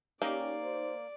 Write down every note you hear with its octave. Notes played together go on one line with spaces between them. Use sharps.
A#3 C#4 D#4 G4 D5
C5